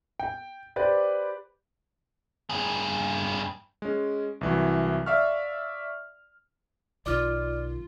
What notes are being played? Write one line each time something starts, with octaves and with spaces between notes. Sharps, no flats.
G5
G4 B4 C5 D5
G2 G#4
G#3 C#4
C2 E3 F#3
D5 E5 F5 C#6 F6
B1 D#3 F4 D5 D6 F6